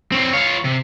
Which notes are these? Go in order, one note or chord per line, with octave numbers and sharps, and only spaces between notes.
C4 C#5
F4 C#5
C3